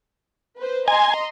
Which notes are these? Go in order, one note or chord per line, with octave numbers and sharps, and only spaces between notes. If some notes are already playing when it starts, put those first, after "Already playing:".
B4 C5
D#5 G#5 A#5 C6